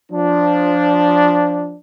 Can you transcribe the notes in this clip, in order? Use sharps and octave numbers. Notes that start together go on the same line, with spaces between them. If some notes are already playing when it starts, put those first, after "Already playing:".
F3 D4